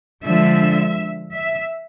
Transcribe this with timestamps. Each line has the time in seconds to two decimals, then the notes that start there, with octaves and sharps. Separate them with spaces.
0.24 D3 F3 G#3 E5
1.33 E5